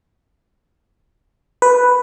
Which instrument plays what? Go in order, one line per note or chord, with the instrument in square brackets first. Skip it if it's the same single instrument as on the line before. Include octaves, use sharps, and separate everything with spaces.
[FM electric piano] B4